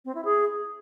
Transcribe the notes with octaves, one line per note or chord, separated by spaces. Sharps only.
C4
E4
G#4